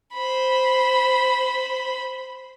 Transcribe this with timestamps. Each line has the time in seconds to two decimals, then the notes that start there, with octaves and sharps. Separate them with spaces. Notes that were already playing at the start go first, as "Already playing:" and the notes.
0.14 C5 B5